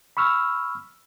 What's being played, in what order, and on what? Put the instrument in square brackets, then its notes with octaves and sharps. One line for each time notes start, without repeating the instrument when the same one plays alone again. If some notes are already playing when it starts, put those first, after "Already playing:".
[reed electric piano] B5 C#6 E6 F6